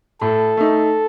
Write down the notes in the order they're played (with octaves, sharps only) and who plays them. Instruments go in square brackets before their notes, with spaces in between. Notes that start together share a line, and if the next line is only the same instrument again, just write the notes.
[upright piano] A2 [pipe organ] A4
[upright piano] A3 D#4